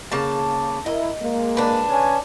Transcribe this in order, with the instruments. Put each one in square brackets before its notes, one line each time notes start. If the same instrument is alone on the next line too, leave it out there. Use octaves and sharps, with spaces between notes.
[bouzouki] C#3 A#3 A5
[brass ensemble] E4 A#4 [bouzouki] D#5
[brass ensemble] G#3 A#3
[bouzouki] D4 B4
[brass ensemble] C#3 C#4 G#5